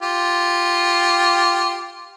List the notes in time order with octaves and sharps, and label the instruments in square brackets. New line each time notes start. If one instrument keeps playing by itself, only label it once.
[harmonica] F4 G4